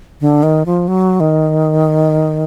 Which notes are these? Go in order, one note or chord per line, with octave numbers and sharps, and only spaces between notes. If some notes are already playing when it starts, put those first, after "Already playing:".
D3
D#3
F3
F#3
D#3